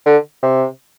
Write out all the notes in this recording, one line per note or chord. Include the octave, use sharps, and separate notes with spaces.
D3
C3